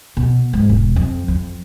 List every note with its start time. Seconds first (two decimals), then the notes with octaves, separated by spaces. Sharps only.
0.17 B2
0.53 G#2
0.69 E1
0.96 F2
1.28 F2